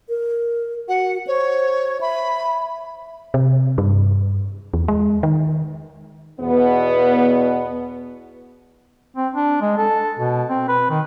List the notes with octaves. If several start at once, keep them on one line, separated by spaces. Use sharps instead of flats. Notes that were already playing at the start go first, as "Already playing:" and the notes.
A#4
F#4 F#5
C5 C#5
E5 B5
C3
G2
E2
G#3
D#3
E2 B2 B3
C4
D4
G#3
A4
B2
C4
B4
D#3